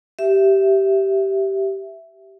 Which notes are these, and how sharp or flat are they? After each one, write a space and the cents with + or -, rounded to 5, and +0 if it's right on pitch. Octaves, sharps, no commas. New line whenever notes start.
G4 -15 E5 +0